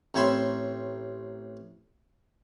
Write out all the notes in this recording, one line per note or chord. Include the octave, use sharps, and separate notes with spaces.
A1 C4 C#5 E5 B5 C6